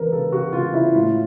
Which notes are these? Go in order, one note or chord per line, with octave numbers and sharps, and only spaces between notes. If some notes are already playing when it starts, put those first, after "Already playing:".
Already playing: E2 C#3 A#4 B4
C#3 A4
C#3 F#4
C#3 F4
C#3 E4
A2 F4